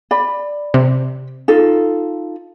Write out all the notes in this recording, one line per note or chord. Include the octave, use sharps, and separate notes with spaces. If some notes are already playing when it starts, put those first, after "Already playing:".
D5 B5
C3
D#4 F4 A4